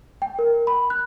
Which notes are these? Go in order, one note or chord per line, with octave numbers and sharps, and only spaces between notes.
G5
A#4
B5
F#6